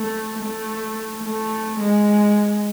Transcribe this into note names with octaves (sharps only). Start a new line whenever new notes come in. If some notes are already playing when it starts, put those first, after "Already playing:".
Already playing: A3
A3
A3
G#3